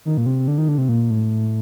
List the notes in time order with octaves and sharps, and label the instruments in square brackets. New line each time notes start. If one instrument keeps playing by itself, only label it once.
[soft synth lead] D#3
A#2
C3
D3
D#3
D3
C3
A#2
A2